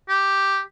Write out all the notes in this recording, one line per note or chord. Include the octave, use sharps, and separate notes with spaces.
G4